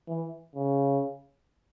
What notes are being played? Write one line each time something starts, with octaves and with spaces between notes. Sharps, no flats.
E3
C#3